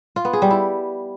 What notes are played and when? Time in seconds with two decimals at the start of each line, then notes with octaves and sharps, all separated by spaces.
0.16 F4
0.25 B3
0.33 G#4
0.42 G3
0.50 E4